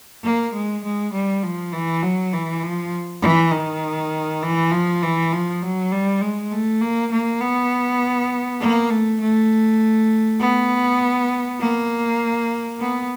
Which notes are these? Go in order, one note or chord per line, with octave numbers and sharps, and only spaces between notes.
A#3
G#3
G#3
G3
F3
E3
F#3
E3
F3
E3
D#3
E3
F3
E3
F3
F#3
G3
G#3
A3
A#3
A#3
B3
A#3
A3
A3
B3
A#3
B3